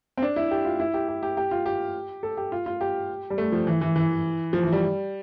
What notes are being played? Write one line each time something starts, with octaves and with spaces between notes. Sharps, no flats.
C4
D4
E4
G4
F4
E4
G4
G4
G4
G4
F4
G4
A4
G4
F4
F4
G4
G3
A3
F3
E3
E3
E3
F3
E3
G3